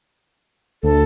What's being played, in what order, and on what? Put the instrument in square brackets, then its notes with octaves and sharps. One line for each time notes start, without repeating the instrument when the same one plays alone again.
[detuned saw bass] D2 [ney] A4